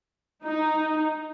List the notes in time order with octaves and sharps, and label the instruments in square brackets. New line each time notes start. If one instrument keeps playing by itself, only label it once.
[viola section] D#4